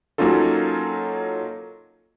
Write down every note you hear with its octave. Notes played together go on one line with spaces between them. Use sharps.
F#3 A#3 C#4 D#4 F4 A4